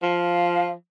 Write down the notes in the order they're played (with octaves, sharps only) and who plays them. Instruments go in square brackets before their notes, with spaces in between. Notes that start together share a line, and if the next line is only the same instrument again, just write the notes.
[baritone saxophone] F3 [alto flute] F5